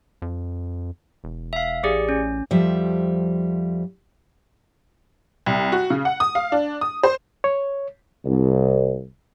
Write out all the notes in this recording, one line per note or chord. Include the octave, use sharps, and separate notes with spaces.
F2
E1
E5 F5
A1 G4 G#4 D5
C#4
F2 F3 G3 E5
C2
F#4
C#3
F#5
D#6
F5
D4
D#6
C5
C#5
C2